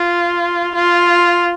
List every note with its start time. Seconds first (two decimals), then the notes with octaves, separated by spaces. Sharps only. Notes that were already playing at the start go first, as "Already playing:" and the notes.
Already playing: F4
0.75 F4